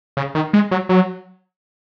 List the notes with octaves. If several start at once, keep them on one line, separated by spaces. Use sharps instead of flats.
C#3
D#3
G#3
F#3
F#3